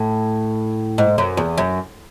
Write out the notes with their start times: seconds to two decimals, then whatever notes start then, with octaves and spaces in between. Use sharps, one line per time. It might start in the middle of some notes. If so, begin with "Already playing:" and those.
Already playing: A2
0.98 G#2
1.18 F#2
1.37 E2
1.58 F#2